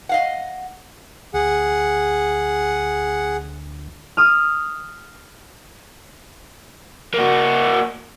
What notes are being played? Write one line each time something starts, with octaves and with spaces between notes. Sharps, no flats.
D#5 F5 F#5
D2 G#4 F#5
D#6 F6
A#3 F#4